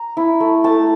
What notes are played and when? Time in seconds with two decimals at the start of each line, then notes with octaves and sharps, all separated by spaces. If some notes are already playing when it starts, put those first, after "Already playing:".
Already playing: A#5
0.17 E4
0.40 A3
0.64 A3 A5